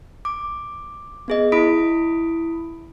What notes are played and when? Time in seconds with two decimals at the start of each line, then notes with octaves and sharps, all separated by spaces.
0.25 D6
1.28 B3 G#4 D#5
1.52 E4 B5 D#6 B6 D7